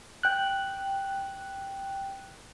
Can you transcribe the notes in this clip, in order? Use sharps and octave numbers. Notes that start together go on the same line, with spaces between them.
G5 F#6